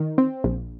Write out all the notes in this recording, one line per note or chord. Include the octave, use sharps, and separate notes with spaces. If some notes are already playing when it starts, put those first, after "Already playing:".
Already playing: D#3
C4
A#1